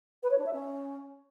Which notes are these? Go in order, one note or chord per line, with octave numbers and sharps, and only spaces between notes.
B4
C#5
D4
E5
C#4